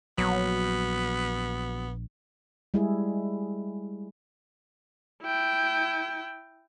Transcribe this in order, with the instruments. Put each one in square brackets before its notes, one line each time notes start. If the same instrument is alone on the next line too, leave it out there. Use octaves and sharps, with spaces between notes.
[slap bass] A#1 [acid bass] F#3 [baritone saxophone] B3
[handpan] G3 G#3 E4 G#4
[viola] E4 G5